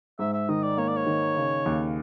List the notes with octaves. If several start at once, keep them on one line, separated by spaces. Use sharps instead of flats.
G#2 E5
E5
D#3 D#5
D5
A#3 C#5
D5
C#5
D#3
C#3
D#2